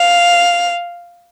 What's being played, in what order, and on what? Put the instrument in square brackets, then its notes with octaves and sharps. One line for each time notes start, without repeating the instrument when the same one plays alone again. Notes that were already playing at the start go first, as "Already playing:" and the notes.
Already playing: [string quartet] F5